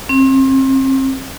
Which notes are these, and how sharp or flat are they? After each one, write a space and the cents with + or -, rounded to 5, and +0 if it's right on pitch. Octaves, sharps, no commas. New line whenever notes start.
C4 +35